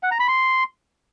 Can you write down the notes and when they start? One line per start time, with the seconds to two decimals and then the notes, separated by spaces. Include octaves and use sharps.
0.03 F#5
0.11 A#5
0.20 B5
0.28 C6